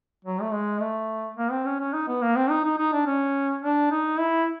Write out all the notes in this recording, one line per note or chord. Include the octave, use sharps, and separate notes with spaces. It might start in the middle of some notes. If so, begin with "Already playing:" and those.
F#3
A3
G#3
A3
A#3
C4
C#4
C#4
D#4
B3
A#3
C4
D#4
D#4
D#4
D4
C#4
D4
D#4
E4